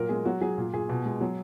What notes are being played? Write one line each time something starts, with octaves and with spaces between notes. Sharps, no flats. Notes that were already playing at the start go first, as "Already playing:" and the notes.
Already playing: A#2 F#3 A#4
G#3 G#4
F#3 F#4
F#3 G#4
A#2
A#2 G#4
B2
G#3
F#3